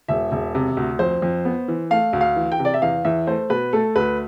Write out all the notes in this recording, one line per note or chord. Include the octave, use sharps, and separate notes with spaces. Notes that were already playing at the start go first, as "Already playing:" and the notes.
E1 E5
E1
C3
D2
F2 C5
F2
B3
E3
A3 F5
D2
F5
E3
G5
C3
D5
E5
E2 F5
E2 E5
A3 C5
B2 B4
A3 A4
D2 B4